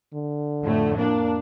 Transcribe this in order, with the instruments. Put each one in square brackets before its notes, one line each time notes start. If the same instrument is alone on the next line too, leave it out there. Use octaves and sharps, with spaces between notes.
[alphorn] D3
[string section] F2 A2 A3
[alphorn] A#3 [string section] D4